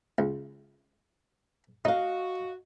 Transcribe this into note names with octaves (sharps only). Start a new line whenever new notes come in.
C#2
D#4 F#4 D#5 F5